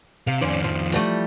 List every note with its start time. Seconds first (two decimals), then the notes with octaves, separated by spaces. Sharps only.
0.27 C3 F5
0.41 F2 D#3 C#4 C5 D5
0.64 F3
0.92 E3 G3 A3